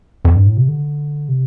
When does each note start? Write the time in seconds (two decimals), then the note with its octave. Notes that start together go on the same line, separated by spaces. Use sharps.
0.25 F2
0.36 G2
0.47 A2
0.57 C3
0.68 D3
1.29 C3